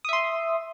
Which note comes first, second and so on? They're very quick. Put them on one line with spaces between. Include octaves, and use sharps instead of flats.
D#6 E5 C6